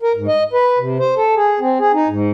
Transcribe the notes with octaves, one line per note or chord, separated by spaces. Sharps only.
A#4
G#2
D#5
B4
C3
C5
A4
G#4
C4
G#4
D#4
G#2